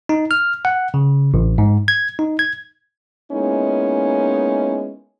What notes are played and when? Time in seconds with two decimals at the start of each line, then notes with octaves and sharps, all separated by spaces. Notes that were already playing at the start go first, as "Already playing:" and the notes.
0.09 D#4
0.31 F6
0.65 F#5
0.94 C#3
1.34 A1
1.58 G#2
1.88 G#6
2.19 D#4
2.39 G#6
3.32 G#3 A#3 B3 C#4 D#4 E4